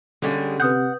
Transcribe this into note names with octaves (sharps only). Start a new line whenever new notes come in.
D3 G3 G#3 A#3 C#4
C3 B4 F#5 D#6 G6